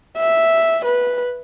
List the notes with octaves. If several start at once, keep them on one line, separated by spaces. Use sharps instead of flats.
E5
B4